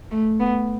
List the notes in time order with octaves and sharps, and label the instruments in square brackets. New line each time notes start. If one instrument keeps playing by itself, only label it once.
[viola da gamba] A3
B3